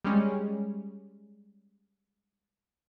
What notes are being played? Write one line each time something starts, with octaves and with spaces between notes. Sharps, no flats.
G3 G#3 C#4